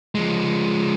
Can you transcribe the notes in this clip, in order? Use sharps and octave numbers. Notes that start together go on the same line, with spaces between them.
F3 G#3